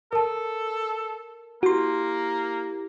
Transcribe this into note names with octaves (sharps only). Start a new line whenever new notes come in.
A4 A#4 A5
A#3 E4 F#4 G4 C6